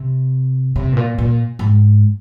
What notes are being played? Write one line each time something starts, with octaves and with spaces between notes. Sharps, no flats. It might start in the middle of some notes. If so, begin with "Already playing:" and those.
Already playing: C3
C3
A2
A#2
A#2
G#2